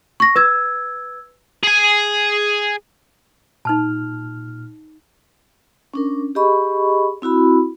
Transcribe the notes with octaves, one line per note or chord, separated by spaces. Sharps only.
C#6 A#6
B4 E6 G#6
G#4 G#5
A#2 D#4 A5 F6
C#4 D4 A#4
G4 G#4 D#5 B5 C#6
C4 E4 F#4 B5